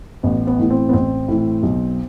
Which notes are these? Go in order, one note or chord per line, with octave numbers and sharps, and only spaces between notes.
A1 B3
B3
A2 E3
C4
B3
A1 C4
A2 E3
B1